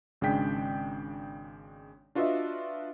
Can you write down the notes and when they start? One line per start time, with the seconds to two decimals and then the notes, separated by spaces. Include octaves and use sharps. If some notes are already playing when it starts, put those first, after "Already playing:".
0.21 G#1 C#3 G#3 D4 G5 B6
2.15 D4 F4 F#4 B4 D#5 E5